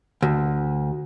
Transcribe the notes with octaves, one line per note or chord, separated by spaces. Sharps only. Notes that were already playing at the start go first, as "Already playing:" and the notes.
D2